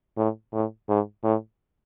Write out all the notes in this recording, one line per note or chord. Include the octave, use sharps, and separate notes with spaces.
A2
A2
G#2
A2